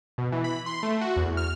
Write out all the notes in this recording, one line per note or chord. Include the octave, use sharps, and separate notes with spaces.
B2
E3
B5
C6
A3
F#4
E2
F6